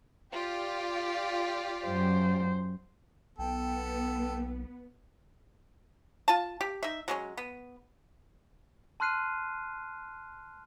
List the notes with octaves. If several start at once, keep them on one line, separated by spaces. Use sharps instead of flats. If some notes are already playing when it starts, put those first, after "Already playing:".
F4 G4 D5
F#2 C5
B1 B3 A4 G5
F4 A5
G4
D#4 E5
F#3 G#3 C#4
B3
A5 C6 F6 F#6 C7 D#7